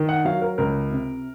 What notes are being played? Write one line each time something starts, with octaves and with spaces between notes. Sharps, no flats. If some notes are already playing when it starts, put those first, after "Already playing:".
Already playing: D#3
F#5
F#3 F5
A#4
C#2 A#4
C3